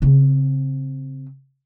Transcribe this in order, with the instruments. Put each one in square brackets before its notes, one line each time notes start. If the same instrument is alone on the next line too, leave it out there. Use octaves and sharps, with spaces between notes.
[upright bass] C#3 C4